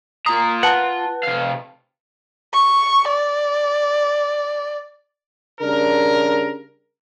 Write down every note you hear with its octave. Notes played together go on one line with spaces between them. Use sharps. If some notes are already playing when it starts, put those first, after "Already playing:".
F4 A#5 D#6
B4 F#5 A5
C3 F5
C#6
D5
C#3 G3 D4 A#4